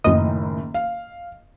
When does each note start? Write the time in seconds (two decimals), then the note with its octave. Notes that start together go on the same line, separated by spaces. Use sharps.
0.04 F#1 F#2 A2 D#3 D#5
0.74 F5